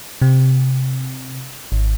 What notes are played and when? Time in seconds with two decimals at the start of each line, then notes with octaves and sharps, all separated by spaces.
0.22 C3
1.72 G#1